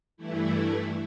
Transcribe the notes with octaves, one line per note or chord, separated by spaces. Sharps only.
G2 E3 A3 E4